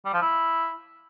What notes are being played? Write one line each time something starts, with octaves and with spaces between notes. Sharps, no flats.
G3
F3
E4